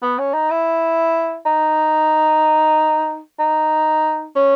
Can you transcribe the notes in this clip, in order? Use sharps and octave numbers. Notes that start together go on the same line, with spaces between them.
B3
C#4
D#4
E4
D#4
D#4
C#4